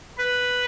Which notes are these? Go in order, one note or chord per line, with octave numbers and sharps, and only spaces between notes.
B4